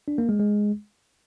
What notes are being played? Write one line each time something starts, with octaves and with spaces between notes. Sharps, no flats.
D4
A#3
G#3
G#3